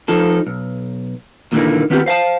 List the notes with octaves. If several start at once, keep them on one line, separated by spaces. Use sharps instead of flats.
F3 D#4 A4
B1
D#2 A#2 D3 E3 A#3 D#4
D#3 B3 C4 F4 G4
C5 F5 G#5 A5